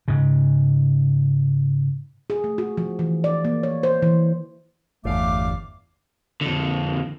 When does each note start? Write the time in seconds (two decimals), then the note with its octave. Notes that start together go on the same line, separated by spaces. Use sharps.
0.08 G#2 C#3
2.30 G#4
2.44 A3
2.58 F#4
2.77 F3
2.99 E3
3.24 D5
3.45 A#3
3.63 C#5
3.83 C5
4.02 E3
5.05 G1 E2 A3 F5 D6
6.41 F2 D3